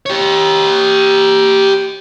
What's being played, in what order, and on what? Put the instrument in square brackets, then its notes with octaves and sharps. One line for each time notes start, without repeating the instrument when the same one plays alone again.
[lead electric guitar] G4 C#5